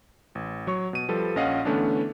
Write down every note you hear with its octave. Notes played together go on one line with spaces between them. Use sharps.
A1
F#3 C#5 C#6
B2 D#7
F3 G3 A4 B4
A#1 C#4 D#5 F5 F#5
D3 E3 A3 B3 C#4 D4